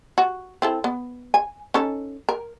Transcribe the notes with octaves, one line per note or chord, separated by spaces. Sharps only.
F#4
C4 E4 A4
B3
G#5
C#4 D#4 A4
A#4